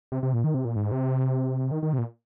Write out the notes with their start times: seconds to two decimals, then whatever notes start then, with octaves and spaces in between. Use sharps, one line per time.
0.12 C3
0.23 C3
0.33 A#2
0.44 D#3
0.54 C3
0.65 A#2
0.76 G#2
0.92 C3
1.71 D#3
1.83 D#3
1.93 C3
1.98 A#2